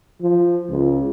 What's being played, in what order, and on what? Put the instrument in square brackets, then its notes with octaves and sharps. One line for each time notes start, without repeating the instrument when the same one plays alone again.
[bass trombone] F3
C#2